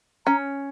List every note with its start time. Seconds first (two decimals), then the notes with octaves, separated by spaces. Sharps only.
0.26 C#4 A#5